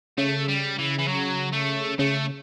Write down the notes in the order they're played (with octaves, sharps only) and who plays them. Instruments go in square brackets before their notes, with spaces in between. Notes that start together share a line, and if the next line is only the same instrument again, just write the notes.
[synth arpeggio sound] C#3 [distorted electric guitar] A3
[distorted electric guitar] G3
E3
E3
F#3
A3
[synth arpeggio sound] C#3 [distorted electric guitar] A3